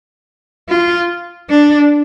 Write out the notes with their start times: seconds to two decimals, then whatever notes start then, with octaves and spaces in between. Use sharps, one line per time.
0.69 F4
1.49 D4